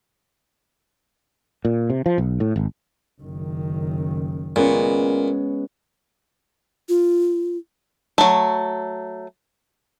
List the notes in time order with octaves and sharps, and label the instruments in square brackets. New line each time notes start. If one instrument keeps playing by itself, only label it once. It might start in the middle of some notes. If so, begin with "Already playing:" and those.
[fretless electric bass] A#2
C3
F3
B1
A2
G#1
[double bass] F#1 D#3
[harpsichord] A#2 [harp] G#3 B3 C#4
[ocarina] F4
[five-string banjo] F#3 A3